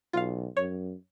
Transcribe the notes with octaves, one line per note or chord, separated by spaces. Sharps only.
B1 F4 F5
F#2 C#5